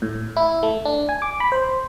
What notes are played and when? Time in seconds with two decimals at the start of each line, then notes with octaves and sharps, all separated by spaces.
0.02 A2
0.36 E4
0.63 A3
0.85 D4
1.09 G#5
1.22 D6
1.40 B5
1.52 C5